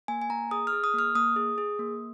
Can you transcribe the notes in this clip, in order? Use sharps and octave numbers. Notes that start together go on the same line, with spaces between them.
A#3 G#5
G#5
A#3 A#5
G#4 D#6
F6
G#4
D#6
A#3 F6
A#3 D#6
G#4
G#4
A#3